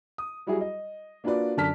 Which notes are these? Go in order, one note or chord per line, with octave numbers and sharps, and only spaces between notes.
D#6
F#3 G3 E4 F#4 G#4
D#5
A#3 D4 F4 F#4 B4 D5
F#2 D3 D5 A5 F6 B6